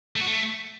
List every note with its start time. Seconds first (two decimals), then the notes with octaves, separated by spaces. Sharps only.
0.16 A3
0.21 F#4
0.26 A3